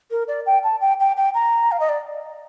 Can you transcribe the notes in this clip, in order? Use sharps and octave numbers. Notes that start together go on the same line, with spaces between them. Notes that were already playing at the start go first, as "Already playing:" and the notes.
A#4
D5
G5
A5
G5
G5
G5
A#5
F5
D#5
D5